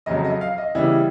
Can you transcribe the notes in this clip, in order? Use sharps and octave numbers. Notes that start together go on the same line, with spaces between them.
F2 C#3 F#3 D#5
D#5
F5
D#5
C#3 E3 G3 B3 E4